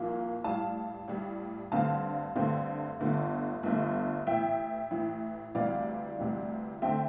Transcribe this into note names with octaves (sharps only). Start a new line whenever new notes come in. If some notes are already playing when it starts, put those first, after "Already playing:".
Already playing: C2 A#2 F3 A#3
A1 A2 G3 F5 A5
A1 A2 G3
G2 D3 A3 C4 F5 A5
G2 D3 A3 C4
G1 G2 D3 A3
G1 G2 D3 A3
A1 A2 E3 E5 G5
A1 A2 E3
D2 C3 E3 G3 D5 F5
D2 C3 E3 G3
D3 A3 C4 E5 G5